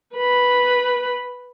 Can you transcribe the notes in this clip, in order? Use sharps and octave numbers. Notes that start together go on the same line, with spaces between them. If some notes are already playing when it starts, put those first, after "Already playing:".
B4 B5